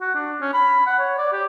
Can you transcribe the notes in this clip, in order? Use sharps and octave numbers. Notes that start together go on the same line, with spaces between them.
F#4
D4
C#4
B5
F#5
C#5
D5
G4